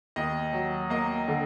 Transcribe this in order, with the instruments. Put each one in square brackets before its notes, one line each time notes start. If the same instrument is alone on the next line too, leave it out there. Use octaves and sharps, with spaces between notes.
[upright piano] D#2 D#5
F#3
A#3 D#5
D3